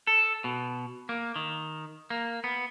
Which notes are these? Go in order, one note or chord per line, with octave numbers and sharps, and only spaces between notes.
A4
B2
A#3
D#3
A#3
B3